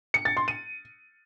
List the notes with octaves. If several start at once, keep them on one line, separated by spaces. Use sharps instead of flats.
C#7
A6
C6
D#7